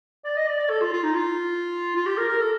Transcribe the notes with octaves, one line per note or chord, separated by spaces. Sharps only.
D5
D#5
D5
D5
A4
F4
F4
D#4
F4
F4
G4
A#4
A#4
A4